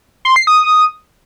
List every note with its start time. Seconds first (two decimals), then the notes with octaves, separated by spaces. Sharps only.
0.25 C6
0.36 C7
0.47 D#6